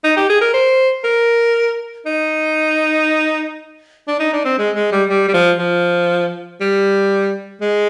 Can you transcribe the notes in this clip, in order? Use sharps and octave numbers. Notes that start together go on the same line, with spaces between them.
D#4
G4
G#4
A#4
C5
A#4
D#4
D4
D#4
D4
C4
G#3
G#3
G3
G3
G3
F3
F3
G3
G#3